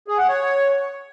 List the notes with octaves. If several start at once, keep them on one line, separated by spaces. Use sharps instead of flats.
G#4
F#5
C#5